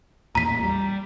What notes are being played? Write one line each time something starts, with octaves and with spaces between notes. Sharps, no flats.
A1 E2 A#2 A#5 B6
G3